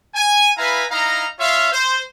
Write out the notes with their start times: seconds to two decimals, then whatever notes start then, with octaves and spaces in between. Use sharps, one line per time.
0.15 G#5
0.57 E4 B4 F5 G#5 A#5 B5
0.90 D#4 E4 F5 A#5
1.39 F4 C#5 E5 F5
1.72 C5